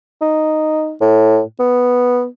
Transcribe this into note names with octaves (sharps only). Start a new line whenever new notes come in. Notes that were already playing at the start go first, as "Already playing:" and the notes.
D#4
A2
B3